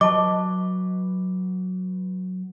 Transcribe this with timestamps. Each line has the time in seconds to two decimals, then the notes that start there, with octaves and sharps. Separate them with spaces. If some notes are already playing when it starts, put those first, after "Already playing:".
0.01 F#3 B4 D#5 A5 C#6 D6